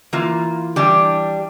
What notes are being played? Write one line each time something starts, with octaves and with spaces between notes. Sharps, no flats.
E3 A#3 F4
E3 G3 D4 G4